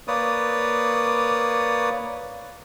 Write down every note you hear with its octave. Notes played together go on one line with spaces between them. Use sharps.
A#3 B4 C#5 D5 D#6